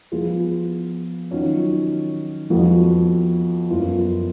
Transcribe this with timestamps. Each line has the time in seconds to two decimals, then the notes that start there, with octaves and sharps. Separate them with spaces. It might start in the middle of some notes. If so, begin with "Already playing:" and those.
0.12 F3 B3 F4 G#4
1.31 D#3 F#3 C#4 F4
2.50 F2 F3 B3 F#4
3.70 F#2 F3 B3 F4